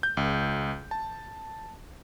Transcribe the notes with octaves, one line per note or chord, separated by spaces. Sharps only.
G6
C#2
A5